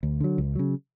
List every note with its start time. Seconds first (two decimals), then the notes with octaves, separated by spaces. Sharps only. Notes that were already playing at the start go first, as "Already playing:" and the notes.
0.03 D2
0.20 D3 F#3
0.38 C#2
0.55 C#3 F#3